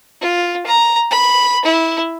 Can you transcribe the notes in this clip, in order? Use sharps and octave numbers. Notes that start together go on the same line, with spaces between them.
F4
A#5
B5
E4